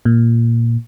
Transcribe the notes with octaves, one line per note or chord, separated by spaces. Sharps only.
A#2